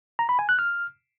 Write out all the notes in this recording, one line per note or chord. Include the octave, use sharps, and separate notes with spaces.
A#5
B5
G#5
F#6
F6